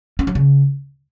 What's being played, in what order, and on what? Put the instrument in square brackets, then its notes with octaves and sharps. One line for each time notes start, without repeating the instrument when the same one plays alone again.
[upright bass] C#4
F#3
C#3